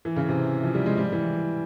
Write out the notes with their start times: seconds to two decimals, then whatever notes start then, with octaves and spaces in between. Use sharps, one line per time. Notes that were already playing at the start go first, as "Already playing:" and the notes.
0.05 E3
0.16 C#3
0.29 C3
0.63 F3
0.74 G3
0.86 G#3
0.97 G3
1.12 E3